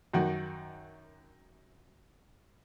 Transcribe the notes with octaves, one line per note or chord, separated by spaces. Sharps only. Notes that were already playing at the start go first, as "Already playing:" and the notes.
F#2 D#3 F#4